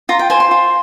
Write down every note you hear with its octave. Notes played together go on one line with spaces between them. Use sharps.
F4 A#5
G5
C5 G#5
C6
F4